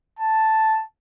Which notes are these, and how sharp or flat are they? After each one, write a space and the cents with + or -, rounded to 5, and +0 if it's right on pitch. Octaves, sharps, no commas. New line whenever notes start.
A5 +0